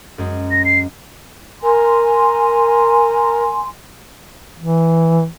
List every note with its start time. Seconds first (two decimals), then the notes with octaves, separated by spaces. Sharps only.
0.18 F#2 G#3
0.51 A#6
0.65 C7
1.62 A#4 G#5 C6
4.59 E3